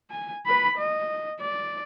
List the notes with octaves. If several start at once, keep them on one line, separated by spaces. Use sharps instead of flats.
G#5
B4 B5
D#5
D5